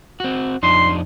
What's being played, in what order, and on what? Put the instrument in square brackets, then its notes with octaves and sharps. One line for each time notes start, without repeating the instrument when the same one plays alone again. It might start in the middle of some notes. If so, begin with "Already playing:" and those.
[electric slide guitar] C4 F#4
[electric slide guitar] F2 D4 D#4 [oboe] C6